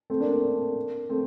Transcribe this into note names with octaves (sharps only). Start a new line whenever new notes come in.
A3 C4
A#3 D4
A#3 D4
A3 C4